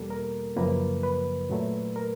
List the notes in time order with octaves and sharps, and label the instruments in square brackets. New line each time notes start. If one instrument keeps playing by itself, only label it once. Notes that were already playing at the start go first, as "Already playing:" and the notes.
Already playing: [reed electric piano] E2 B2 G3 A#3 A4
A#4
F#2 C#3 F3 A#3 B4
B4
A#2 F#3 A3
A#4